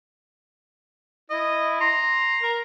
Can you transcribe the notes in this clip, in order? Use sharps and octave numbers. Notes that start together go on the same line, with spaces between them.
E4 D#5
A#5 C6
A#4